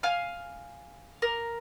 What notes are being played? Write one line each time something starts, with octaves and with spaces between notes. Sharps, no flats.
F5 G#5 F6
A#4